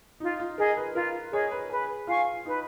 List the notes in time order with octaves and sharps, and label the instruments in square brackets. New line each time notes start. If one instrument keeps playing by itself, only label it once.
[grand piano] D#4 [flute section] F4
[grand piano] F4
[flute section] G#4 D#5 [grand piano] A#4
[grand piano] B4
[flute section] F4 [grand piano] A#4
[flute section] G#4 D#5 [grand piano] C#5
[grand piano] B4
[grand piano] G#4 [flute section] B4
[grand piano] F4 [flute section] F5 G#5 C#6
[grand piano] D#4 [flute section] B4